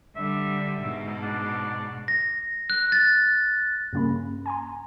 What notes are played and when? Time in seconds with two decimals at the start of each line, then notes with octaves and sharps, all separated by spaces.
0.16 D3 G3 E5
0.80 G#2 B2
1.22 D4
2.08 A#6
2.70 F#6
2.92 A6
3.93 G2 C#3 A#3 C#4 B5
4.46 G#5 A#5 C6